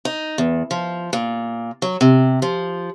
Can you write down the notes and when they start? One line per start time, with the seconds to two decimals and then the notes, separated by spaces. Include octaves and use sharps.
0.05 D#4
0.38 E2
0.71 F3
1.13 A#2
1.82 F#3
2.01 C3
2.42 F3